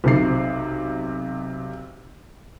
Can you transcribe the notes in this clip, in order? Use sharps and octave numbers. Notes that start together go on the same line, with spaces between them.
B1 C3 C7